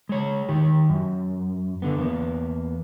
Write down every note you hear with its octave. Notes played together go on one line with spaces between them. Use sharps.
G#3 C#5
D#3 G4
F#2
D3 B3
E2 A#3 B3